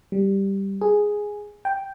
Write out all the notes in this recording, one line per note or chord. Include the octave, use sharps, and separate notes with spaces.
G3
G#4
G5